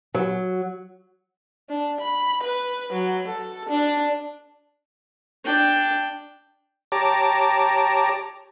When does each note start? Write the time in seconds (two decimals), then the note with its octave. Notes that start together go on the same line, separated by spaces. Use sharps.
0.14 F#3
1.70 D4
2.01 B5
2.43 B4
2.93 F#3
3.28 A4
3.69 D4
5.45 D4 G5
6.92 G4 C#5 A5 A#5 D6